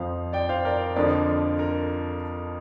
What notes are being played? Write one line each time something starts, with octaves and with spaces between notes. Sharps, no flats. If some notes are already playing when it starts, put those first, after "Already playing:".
Already playing: F2 F3 C5 F5
D5 G5
C5 F5
A#4 D5
F2 D3 F3 A#4 D5
A#4